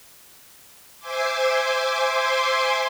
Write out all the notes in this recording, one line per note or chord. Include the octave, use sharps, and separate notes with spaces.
C5 E5 G#5 C6 D6